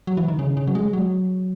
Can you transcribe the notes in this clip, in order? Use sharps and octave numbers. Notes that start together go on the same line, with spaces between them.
F#3
E3
D#3
C#3
C#3
F#3
G#3
F#3